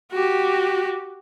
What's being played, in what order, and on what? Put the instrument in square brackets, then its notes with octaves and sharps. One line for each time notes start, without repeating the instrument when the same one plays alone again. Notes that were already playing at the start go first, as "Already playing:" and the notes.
[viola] F#4 G4